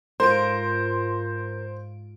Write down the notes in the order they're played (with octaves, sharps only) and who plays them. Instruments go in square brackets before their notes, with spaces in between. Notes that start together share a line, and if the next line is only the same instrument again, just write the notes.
[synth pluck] G#2 F4 D7 [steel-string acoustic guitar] A#4 [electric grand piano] C5 [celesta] C6